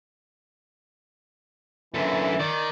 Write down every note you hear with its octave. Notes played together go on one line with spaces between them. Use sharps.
F#2 D3 E3
D#3 D5